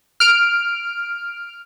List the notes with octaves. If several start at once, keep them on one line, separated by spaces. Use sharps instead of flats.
F6 D7